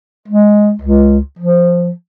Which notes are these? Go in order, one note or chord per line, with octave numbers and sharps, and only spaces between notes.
G#3
C#2
F3